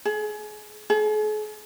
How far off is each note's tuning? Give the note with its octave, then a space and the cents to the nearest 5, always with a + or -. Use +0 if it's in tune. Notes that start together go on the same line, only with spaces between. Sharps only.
G#4 +30
G#4 +45